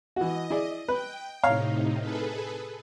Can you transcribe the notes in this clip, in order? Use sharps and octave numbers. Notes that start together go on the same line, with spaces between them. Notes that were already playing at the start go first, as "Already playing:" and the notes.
E3 F#4 D#5
E4 G#4 D5
B4 G5
A2 C3 D#4 C#5 F5 A#5
G#4 A4 B4